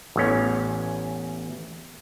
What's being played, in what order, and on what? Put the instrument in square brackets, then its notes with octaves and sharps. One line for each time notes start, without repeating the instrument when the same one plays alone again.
[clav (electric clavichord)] A1 E2 C#4